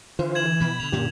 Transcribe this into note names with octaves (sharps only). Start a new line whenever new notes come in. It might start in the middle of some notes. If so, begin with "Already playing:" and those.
D3 E3 F4 C5
G#6 E7 F#7
B2 F3 B5
B2 D3 F7
F#2 A#2 D3 C#4 G4